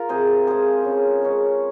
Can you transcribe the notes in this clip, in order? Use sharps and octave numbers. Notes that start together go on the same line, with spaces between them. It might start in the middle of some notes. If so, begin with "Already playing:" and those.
Already playing: F4 A#4
C3 G#4 C5
F3 G#3 G#4 C5
C#3
G#3 C#4